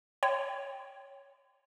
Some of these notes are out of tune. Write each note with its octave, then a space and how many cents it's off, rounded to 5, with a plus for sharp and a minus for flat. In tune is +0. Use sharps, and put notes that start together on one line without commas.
C#5 +0 G5 +0 C6 -40